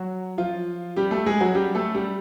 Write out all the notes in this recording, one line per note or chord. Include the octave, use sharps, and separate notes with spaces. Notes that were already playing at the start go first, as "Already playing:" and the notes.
Already playing: F#3 F#4
F3 F4
G3 G4
A3 A4
G#3 G#4
F#3 F#4
G3 G4
A3 A4
G3 G4